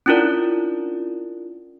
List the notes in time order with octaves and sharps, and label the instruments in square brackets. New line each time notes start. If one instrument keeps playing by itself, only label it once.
[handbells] C#4 D4 E4 F4 A#4 D5